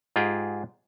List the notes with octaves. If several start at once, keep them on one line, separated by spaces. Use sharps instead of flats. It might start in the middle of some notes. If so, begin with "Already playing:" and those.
G#2 F4 G4 G#4 G5